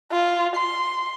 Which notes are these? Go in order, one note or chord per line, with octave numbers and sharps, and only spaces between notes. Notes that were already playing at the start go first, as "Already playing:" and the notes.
F4
C6